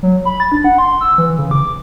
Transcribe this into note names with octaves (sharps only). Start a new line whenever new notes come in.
F#3
B5
A6
D4
F#5
C6
E6
E3
C#3
D6